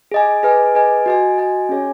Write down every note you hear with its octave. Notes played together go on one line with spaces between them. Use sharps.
G#4 D#5 G#5
G#4 B4 D#5 G#5
G#4 B4 D#5 G#5
F#4 D#5 G#5
F#4 D#5 G#5
C#4 G#4 C#5 G#5